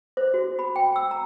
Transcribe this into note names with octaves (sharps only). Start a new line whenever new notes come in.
C5
F#4
B5
G5
E6
A#5